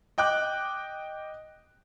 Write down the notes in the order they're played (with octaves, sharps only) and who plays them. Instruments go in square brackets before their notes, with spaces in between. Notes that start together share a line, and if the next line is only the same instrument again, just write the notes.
[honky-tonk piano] D#5 G5 D6 F#6